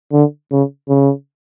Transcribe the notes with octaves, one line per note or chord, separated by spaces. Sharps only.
D3
C#3
C#3